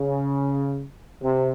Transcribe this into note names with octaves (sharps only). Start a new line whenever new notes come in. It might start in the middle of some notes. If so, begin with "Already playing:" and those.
Already playing: C#3
C3